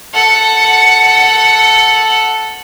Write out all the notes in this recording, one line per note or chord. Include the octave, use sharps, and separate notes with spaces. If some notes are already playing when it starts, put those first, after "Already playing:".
A4 F#5